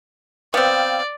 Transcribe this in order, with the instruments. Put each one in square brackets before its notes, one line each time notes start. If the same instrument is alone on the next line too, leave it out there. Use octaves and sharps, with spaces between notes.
[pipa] B3 C4 [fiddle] D5 [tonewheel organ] F5 G5